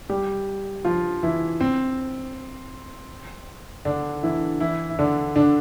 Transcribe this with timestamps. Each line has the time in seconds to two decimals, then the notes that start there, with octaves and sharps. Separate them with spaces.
0.09 G3 G4
0.85 F3 F4
1.23 E3 E4
1.61 C4
3.85 D3 D4
4.23 E3 E4
4.60 E3 E4
4.90 E4
4.99 D3 D4
5.36 D3 D4